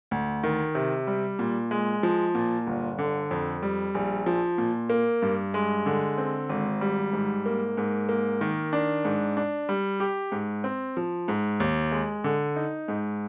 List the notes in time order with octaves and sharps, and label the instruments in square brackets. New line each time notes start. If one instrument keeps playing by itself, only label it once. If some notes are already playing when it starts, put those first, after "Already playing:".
[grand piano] D2
D#3
C3
G3
A#2
G#3
F3
A#2
G1
D3
F2
G3
A#1
F3
A#2
A#3
G2
G#3
D3
C4
G#1
G3
G#2
A#3
G#2
A#3
D#3
D4
G#2
D4
G3
G4
G#2
C4
F3
G#2
D#2
G#3
D3
D#4
G#2